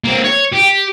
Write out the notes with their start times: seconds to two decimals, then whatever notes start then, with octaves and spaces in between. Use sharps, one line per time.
0.04 A#3 C4
0.24 C#5
0.52 G4